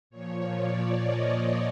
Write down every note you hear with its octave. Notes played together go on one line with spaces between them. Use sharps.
A#2 F3 C#5
D5
D#5